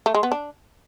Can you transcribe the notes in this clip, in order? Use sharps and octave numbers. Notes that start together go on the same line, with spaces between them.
A3
G#3
B3
D4